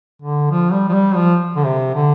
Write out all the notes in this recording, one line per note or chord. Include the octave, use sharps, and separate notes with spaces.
D3
F3
G3
F3
G3
F3
D3
C3
D3